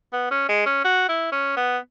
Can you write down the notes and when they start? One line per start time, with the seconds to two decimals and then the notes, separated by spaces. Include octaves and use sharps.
0.13 B3
0.31 C#4
0.49 G#3
0.66 C#4
0.85 F#4
1.09 E4
1.32 C#4
1.56 B3